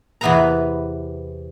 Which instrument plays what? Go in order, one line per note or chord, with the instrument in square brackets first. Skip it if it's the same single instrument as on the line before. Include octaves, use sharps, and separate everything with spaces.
[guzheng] E2 C3 B3 B4 E5 A#5